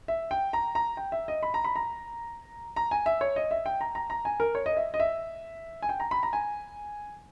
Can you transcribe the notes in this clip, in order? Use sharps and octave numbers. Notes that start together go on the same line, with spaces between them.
E5
G5
A#5
A#5
G5
E5
D#5
B5
A#5
B5
A#5
A#5
G#5
E5
C#5
D#5
E5
G5
A#5
A#5
A#5
G#5
A#4
C#5
D#5
E5
D#5
E5
G#5
G5
A#5
B5
A#5
G#5